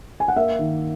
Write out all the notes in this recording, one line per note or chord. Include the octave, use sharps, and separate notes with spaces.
G#5
F#5
A#3 E5
D#3